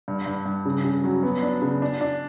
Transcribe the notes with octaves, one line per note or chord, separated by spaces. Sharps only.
G2
G2
G2
C#3
C#3
F#3
B3
D4
C#3
D4
D4